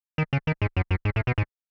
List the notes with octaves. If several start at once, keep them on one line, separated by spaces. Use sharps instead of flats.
D#3
C#3
D#3
G#2
F#2
F#2
G#2
A2
B2
G#2